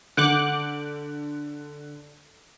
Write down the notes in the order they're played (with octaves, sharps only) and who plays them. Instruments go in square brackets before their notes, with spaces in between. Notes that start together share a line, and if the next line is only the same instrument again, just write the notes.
[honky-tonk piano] D3 G6 [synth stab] F#5 D6 F#6